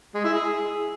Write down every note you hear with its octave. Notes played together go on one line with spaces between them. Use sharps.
G#3
E4
G#4